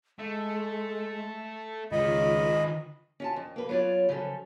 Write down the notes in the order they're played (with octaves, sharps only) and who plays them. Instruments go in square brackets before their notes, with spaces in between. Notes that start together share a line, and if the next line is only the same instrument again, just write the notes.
[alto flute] G#3 [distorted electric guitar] A3
[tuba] C#2 [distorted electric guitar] D#3 B4 [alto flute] F4 [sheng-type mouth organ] D#5 B5
[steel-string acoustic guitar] C#4 F4 A5
F2
A#3 B4
F#3 B3 F4 C#5 D5
C#3 F3 F#3 C#4 A4